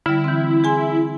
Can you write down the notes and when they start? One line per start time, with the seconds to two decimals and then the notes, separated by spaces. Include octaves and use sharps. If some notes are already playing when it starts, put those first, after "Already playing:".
0.06 D3 G3 E4
0.24 E3 C4
0.64 G#4 G#5 C6